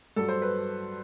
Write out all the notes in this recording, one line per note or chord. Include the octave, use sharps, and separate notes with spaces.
G2 F#3 A4
C5
B4